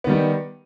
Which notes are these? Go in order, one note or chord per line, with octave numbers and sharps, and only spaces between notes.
D#3 G3 B3